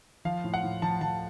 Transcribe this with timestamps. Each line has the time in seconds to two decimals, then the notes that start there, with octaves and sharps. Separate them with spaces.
0.25 F3 F5
0.44 A2
0.54 F#5
0.63 A2
0.82 F3 A5
1.01 F3 A5